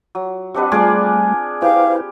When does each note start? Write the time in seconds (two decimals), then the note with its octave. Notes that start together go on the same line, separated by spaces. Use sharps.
0.15 F#3
0.54 C4 D4 G4 B4 D#5 F#5
0.72 G3 A3 D4 F4 G#4 D5
1.62 E4 G4 B4 C5 F5